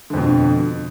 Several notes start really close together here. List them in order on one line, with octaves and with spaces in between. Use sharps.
D3 F2 B2